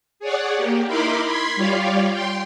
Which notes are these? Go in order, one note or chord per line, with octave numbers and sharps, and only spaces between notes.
G#4 C#5 D5 F#5
A#3 G4
D#4 E4 A#4 B5 C6 D6
B5 C6 G#6 B6
G3 F4 G4 C#5 D5 F5
G5 C6